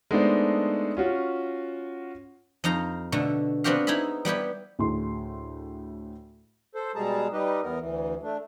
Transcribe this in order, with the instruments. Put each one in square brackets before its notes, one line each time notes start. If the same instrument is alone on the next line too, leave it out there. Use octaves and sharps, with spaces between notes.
[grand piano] G#3 A3 B3 D4 D#4 C5
C#4 F4 F#4
[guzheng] F2 D#4 F5 A#5
B2 D3 A3
B3 C4 D4 F#4 G4 F5
D#4 E4 G#4 E5 B5
G3 B3 E4 G4
[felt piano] D2 A2 G#4 C6
[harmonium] A4 C5
B2 G3 G#3 G#4 A5 A#5
G3 D#4 G4 B4 D#5
E2 B3 A#4
D2 E3
A3 D4